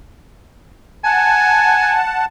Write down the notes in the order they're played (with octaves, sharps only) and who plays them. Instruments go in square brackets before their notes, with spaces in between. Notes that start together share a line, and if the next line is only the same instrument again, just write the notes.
[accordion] F#5 A5 [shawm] G#5